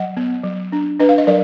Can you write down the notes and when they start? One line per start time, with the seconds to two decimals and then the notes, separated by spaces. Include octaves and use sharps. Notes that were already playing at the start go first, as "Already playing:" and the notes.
Already playing: F#3 D#5 F#5
0.17 B3
0.44 F#3
0.72 D4
1.00 D4 B4 D#5
1.09 F5
1.18 D#5
1.27 F#3 A#4 D5